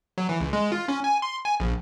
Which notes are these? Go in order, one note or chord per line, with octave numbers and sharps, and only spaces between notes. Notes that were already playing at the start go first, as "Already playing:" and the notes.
F#3
E3
C#2
G#3
F4
C#4
G#5
C6
G#5
A#1